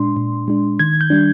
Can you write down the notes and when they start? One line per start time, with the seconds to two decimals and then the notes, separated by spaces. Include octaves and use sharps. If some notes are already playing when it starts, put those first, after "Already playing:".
Already playing: A#2 G#3 D4 C6
0.16 A#2
0.48 G#3 D4
0.79 D#3 G#6
1.01 G6
1.10 G3 D4